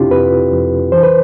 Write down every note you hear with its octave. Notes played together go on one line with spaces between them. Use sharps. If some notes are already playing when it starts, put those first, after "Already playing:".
Already playing: F2 C3 C4 D4 E4 F4 G4
F2 B4
F2
E3 C5
B4